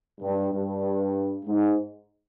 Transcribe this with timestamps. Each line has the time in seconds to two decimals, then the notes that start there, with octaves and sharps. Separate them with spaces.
0.21 G2
0.52 G2
1.46 G#2